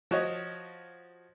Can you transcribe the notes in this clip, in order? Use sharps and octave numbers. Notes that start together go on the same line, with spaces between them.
F3 F#4 C#5 D#5